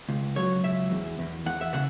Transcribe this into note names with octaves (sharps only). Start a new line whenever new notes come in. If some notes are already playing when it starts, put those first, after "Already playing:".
C#2
F#3 C#5
C#2 E5
E2
E2
E2 F#5
E5
C#3 F#5